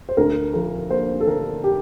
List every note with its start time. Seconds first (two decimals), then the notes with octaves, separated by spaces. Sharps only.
0.09 C5
0.17 D2 A#4
0.54 F3 A#4
0.90 A#3 C5
1.20 A4
1.27 D3 A#4
1.64 G4